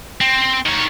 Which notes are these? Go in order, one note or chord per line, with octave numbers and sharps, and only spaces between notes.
C4
D#3 C#5